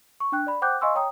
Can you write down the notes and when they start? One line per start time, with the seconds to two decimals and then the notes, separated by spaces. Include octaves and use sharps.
0.20 C#6
0.32 D4 G5 F#6
0.47 D5 B5
0.62 C5 F#5 G5 D6 F#6 G6
0.81 D#5 F5 G#5 C6 C#6 E6
0.95 C#5 G5 A#5 D#6